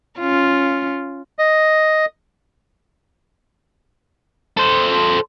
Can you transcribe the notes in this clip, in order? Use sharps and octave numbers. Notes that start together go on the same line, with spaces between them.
C#4 F4
D#5
A4 C5